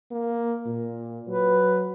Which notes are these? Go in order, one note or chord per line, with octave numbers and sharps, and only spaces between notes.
A#3
A#2
F#3 B4